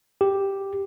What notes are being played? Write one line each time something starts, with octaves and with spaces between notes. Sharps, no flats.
G4